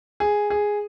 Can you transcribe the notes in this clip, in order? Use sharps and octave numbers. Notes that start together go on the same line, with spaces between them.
G#4
G#4